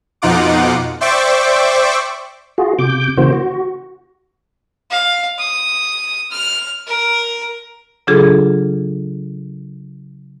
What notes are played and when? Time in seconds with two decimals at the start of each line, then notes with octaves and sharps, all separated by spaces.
0.22 F2 B2 D#4 F4 F#5 D6
1.01 C5 D5 E5 G5 C#6 D6
2.58 F4 F#4 G#4
2.79 C3 D6 G6
3.17 C#3 E3 A#3 F#4 C5
3.33 F#4
4.91 F5
5.39 D#6
6.31 F6
6.88 A#4
8.07 C#3 F#3 D4 F4 G#4 A4